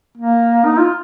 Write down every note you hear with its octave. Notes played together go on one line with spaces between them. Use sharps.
A#3
D#4
F4